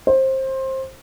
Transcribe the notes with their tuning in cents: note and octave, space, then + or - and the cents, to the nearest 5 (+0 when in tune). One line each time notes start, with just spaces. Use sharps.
C5 +20